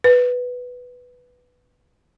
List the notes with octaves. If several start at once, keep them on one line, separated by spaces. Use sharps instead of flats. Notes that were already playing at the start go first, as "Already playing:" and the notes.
B4